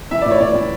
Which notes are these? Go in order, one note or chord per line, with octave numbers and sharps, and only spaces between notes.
E3 E5
A2 D5
C#5
A2 D5
E3